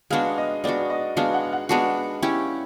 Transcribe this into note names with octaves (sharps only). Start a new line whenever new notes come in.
G#3 B3 D4 F#4 F5
D#5
G#3 B3 D4 F#4 D5
D#5
G#3 B3 D4 F#4 F5
F#5
F#5
G#3 B3 D4 F#4
C#4 E4 G4